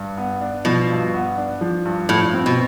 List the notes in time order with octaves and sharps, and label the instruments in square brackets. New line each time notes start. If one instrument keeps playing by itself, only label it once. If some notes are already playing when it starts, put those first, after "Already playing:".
Already playing: [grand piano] G2
B3
D4
[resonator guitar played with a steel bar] B2 [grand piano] F3
[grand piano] G2
B3
D4
F3
G2
[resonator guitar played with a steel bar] A2 [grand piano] F3
[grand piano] C4
[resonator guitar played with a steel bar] B2